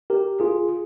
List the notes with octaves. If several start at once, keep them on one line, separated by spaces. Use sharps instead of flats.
G4 A#4
F4 G#4